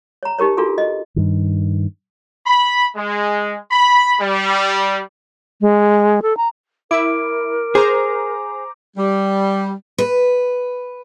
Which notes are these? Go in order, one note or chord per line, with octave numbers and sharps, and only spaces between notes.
C#5 A#5
D#4 G4 A#4 C#5
D4 F4 F#4 G#4 A4
D#5
G2 D#3
B5
G#3
B5
G3
G#3
A4
A#5
E4 A#4 D6 D7
G#4 C5 A#5 D6
G3
B4